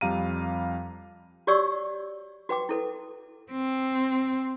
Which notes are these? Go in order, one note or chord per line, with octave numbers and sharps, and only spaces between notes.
F2 G3 F5 A#5 D#7
F#4 G4 C#5 D5 C#6 E6
F#4 B4 G5 D6
E4 A4 B4
C4